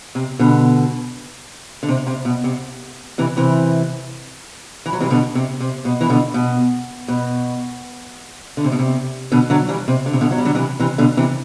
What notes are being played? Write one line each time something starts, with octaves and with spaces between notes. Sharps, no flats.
C3
B2 D3
D3
C3
C3
B2
C3
C3 E3
C3 E3
E3
F#3
C3 E3
B2 D3
C3
C3
B2
E3
B2 D3
B2
B2
D3
C3
B2
C3
B2 D3
D3 F#3
E3 G3
C3
D3
C3
B2 D3
F#3
G3
D3 F#3
C3 E3
C3 E3
B2 D3
C3 E3